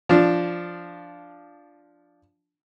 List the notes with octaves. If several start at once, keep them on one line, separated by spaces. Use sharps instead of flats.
F3 D4